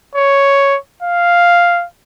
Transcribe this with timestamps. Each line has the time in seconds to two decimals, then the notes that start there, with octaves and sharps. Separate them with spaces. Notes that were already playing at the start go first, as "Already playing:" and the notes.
0.16 C#5
1.03 F5